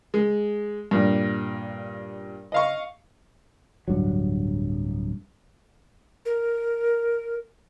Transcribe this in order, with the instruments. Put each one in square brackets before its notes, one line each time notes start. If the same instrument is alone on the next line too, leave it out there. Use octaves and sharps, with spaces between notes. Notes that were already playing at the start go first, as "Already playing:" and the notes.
[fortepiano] G#3
G2 A#2
D#5 F5 C#6
[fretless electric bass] D1 G2 F#3
[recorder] A#4